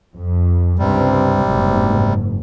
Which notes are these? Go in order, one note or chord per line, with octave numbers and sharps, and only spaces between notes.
F2
C#2 G2 C3 G3 C4
F#1 G#2